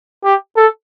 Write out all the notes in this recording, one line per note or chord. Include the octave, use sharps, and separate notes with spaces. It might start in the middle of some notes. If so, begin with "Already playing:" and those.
G4
A4